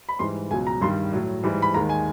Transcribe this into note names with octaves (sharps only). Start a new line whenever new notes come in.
B5
G#2 E3 G3 C6
C#2 B2 F#3 G#5
A#5
G2 D#3 G3 C6
A2 F#3
G#2 E3 G3
B5
D#2 D#3 G#3 A#5
G#5